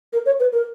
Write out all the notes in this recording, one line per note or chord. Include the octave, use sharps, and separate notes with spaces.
A#4
C#5
B4
A#4